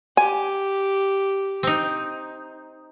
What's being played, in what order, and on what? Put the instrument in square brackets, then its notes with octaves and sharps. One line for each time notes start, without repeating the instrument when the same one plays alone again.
[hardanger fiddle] G4 [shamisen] G#5
[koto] C4 D#4